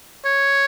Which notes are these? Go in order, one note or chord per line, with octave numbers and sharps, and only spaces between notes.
C#5